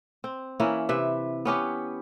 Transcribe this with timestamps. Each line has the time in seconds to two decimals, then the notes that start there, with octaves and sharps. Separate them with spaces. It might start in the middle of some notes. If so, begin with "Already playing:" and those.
0.24 C4
0.60 E3 A#3 C#4 E4
0.89 C3 B4 E5
1.45 B3 C#4 G4 B4